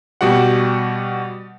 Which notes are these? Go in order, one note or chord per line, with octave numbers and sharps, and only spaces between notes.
B2 G3 F#4 G4 F#5